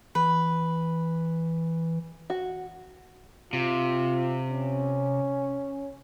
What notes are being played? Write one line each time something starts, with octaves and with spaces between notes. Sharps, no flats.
E3 B4
F#4
C3 F4
C#4